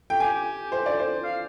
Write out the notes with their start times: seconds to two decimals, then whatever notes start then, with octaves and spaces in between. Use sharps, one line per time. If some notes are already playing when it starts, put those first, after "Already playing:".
0.10 G5
0.20 G4 G#5
0.72 C5
0.86 D5
0.99 C5
1.24 F5